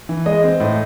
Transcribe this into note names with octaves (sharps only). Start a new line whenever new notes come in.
E3
G#3 D#5
C4
A2